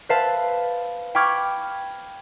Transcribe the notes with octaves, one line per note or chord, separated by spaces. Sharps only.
B4 C5 E5 F5 A5
G5 B5 C#6 D6 F6 G#6